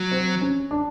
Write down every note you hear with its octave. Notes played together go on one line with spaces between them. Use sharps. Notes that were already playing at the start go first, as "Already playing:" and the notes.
Already playing: F#3
C4
C#4
D4